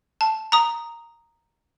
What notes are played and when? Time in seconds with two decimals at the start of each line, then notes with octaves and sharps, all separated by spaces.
0.21 A5
0.52 A#5 D#6